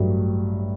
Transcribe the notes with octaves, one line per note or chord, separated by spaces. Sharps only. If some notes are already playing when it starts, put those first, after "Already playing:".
Already playing: A1 G2 F#3 A3